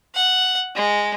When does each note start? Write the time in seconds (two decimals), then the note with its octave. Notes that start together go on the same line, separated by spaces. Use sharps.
0.15 F#5
0.75 G#3